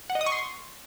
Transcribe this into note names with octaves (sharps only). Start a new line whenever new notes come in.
F#5
D#5
D#6
C#6
C6